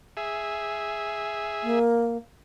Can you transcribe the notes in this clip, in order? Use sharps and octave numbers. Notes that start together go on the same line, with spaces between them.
G#4 E5
A#3